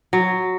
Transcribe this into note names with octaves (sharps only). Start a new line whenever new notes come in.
F#3